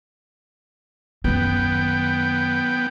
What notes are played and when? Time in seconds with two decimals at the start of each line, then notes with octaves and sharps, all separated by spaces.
1.24 F#2 D#3 B3 G5